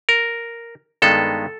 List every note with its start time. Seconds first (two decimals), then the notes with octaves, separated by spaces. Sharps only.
0.09 A#4
1.02 G2 D#3 G#3 B3 A4